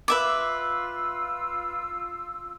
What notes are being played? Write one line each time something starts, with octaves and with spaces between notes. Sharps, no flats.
F4 B4 E5 D6 E6